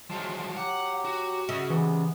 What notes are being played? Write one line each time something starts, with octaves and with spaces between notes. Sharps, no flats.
D2 F3 F#3 G#3 C6
F#3 G4 F#5
F#4
C#3 D#5 E5 F6
C3 E3 G#3 B3